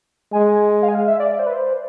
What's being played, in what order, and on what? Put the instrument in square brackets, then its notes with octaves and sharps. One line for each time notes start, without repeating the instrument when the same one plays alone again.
[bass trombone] G#3 [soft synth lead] G#5
[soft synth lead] F5
G#5
F5
E5
D5
D5
C5
B4
C5